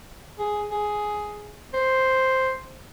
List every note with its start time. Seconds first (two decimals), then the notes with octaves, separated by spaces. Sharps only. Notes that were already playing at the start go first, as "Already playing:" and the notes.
0.39 G#4
0.71 G#4
1.73 C5